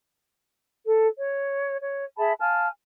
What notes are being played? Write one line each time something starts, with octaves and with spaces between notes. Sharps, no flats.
A4
C#5
C#5
G#4 E5 A5 B5
F5 G#5 A5 F6